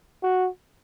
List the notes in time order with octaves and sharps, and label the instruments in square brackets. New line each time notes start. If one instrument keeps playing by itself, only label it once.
[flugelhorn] F#4